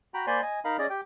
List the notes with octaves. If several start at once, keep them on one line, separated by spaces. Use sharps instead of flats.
F#4 G5 A#5 B5
A#3 C5 D5 G#5 B5 C6
D#5 G#5
D#4 A#4 D#5 F5 A#5 B5
C#4 G#4 D5 D#5
G4 G5